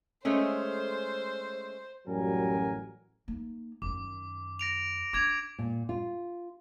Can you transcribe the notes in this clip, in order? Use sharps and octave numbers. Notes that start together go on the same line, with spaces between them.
G#3 A3 C#4 C5
A1 F#2 F#3 G3 A#4 G#5
A#3 D#4
F#2 D#3 D6
A#6 D7 F7
D4 D6 G#6 F7
A#2
F4